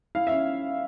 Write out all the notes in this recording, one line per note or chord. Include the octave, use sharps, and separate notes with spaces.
E4 F5
C#4 E5